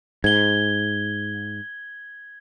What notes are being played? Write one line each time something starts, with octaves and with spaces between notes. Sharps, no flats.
G#2 G#6 G7